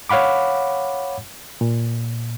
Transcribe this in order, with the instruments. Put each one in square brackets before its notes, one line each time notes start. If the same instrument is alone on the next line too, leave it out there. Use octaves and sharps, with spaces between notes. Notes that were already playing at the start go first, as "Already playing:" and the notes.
[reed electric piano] C#5 F5 F#5 B5 D6
A#2